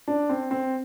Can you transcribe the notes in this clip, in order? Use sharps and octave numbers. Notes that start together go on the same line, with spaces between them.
D4
C4
C4